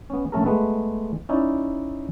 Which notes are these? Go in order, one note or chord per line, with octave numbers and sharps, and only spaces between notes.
B3 C#4
A#1 A3 C#4 A4 A#4
G#3 A3 B3 B4
C#4 D#4 E4 D5